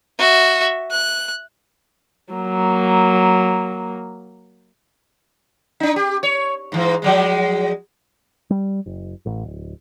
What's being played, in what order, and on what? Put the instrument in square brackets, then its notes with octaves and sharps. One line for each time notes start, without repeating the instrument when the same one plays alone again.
[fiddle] F#4 E5
F#6
[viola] F#3 A#3
[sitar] D4 D#4
G4
C#5
G#2 E3
F3 F#3 G#3
[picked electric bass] G3
F#1
A1
D1